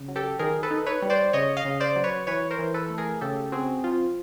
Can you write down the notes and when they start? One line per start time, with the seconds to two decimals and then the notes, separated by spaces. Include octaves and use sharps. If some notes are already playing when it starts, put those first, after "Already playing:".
Already playing: C#3
0.08 F#3
0.16 G4 A4
0.39 D#3 G#4 A#4
0.63 A4 B4
0.71 D#4
0.86 B4 C#5
1.02 G3
1.10 C5 D5
1.33 C#3 C#5 D#5
1.57 D#5 F5
1.65 C#3
1.80 C5 D5
1.96 F#3
2.04 B4 C#5
2.27 E3 B4 C#5
2.51 A#4 C5
2.59 E3
2.74 A4 B4
2.90 A3
2.98 G#4 A#4
3.21 C#3 G4 A4
3.52 C4 F#4 G#4
3.84 F3 F4